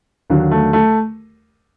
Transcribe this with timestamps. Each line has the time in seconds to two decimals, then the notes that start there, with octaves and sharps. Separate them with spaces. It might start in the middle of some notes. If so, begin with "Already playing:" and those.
0.30 D#2 D3 F#3
0.51 A3
0.73 A3